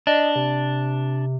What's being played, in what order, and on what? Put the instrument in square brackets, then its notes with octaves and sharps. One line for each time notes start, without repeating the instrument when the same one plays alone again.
[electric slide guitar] D4 [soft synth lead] D#5
[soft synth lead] C3